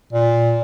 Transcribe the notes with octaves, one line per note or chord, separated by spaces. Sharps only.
A#2